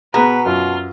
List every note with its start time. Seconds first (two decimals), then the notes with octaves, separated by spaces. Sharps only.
0.14 B2 B3 G#4 B4 A#5
0.46 F#2 F4